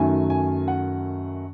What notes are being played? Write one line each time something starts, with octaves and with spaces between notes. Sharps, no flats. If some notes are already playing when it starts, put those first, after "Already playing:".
Already playing: F#2 D#3 F#3 A3 G#5
G#5
F#5